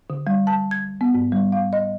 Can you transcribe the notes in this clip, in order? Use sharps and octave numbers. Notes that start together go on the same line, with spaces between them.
D3
G3
A5
G#6
B3
G#2
G3
F5
D#5